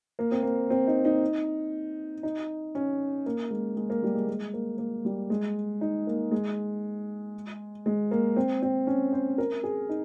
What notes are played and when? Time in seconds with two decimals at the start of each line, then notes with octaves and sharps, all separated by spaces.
0.19 A#3
0.32 C4
0.43 A#3
0.70 C4
0.87 D#4
1.05 D#4
2.23 D#4
2.75 C#4
3.26 A#3
3.51 G#3
3.77 G#3
3.90 A#3
4.03 G3
4.14 G#3
4.27 G#3
4.54 A#3
4.78 A#3
5.05 G3
5.30 G#3
5.81 D#4
6.07 A#3
6.31 G#3
7.86 G#3
8.11 A#3
8.36 C4
8.62 C4
8.87 C#4
9.12 C5
9.38 A#4
9.63 G#4
9.89 D#4